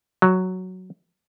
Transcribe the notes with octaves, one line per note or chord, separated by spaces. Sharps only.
F#3